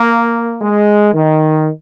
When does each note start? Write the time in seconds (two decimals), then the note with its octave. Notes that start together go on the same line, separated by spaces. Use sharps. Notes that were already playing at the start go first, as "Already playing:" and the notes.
Already playing: A#3
0.61 G#3
1.13 D#3